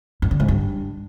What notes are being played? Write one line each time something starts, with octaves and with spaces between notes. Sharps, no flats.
G2
D3
G#2
G2